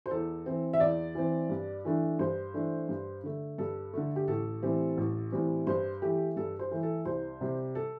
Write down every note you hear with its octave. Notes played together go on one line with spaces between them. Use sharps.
C5
E2 A4
E3 C4
E5
E2 D5
E3 C4
G2
E3 A3 D4
G2 C5
E3 A3 D4
G2
D3 A3
G2 A4
D3 A3
G4
A1 A4
A2 E3 G3 C4
A1
A2 E3 G3 C4
G2 C5
E3 A3 G4
G2 A4
C5
E3 A3
A4
C2 C5
C3 G3
A4